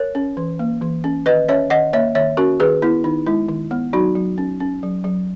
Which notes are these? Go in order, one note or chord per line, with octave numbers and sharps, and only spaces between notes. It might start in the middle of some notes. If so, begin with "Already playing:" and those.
Already playing: A#4 C#5
C#4
E3
A#3
E3
C#4
D#3 B4 D#5
C#4 C#5 E5
D#3 D#5 F#5
A#3 C#5 E5
D#3 C#5 E5
C#4 F#4 A#4
D#3 G#4 B4
B3 E4
D#3 D#4
G#3 E4
D#3
B3
F#3 D#4 F#4
F#3
C#4
C#4
F#3
F#3